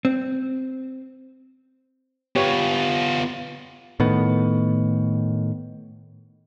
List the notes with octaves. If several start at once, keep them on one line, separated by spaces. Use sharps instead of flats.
C4
B3 F4 G4 B4 C#5
A2 D#3 B3